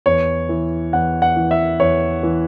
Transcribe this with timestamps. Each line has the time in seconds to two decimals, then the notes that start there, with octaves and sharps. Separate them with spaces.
0.06 E2 C#5
0.49 E3
0.93 E2 F#5
1.22 F#5
1.36 E3
1.51 E5
1.80 E2 C#5
2.23 E3